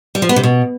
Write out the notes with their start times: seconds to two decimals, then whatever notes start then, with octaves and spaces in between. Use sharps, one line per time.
0.15 G3
0.22 F3
0.29 B3
0.36 C3
0.43 B2